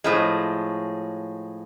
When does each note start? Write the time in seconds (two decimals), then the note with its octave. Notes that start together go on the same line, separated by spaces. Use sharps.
0.04 A2 F3 G#3